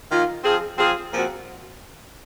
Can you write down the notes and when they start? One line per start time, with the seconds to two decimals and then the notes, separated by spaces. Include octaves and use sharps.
0.11 D#3 A#3 F4
0.44 F3 C4 F4 G#4
0.78 F3 C4 F4 G#4
1.12 A#2 F3 C4 F#4